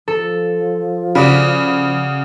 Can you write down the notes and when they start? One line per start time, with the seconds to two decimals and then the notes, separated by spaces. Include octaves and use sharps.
0.08 F3 A4
1.15 C#3 F#4 D5 B5